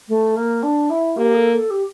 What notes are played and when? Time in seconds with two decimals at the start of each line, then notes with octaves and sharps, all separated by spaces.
0.08 A3
0.36 A#3
0.63 D4
0.90 E4
1.16 A#3 G4
1.35 A4
1.52 A4
1.70 G4